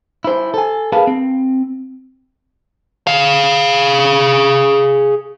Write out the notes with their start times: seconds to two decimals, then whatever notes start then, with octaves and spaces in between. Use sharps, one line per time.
0.24 E4 C5
0.54 A4 G#5
0.92 G#4 A#4 B4 F5 A5
1.07 C4
3.07 G#4 F5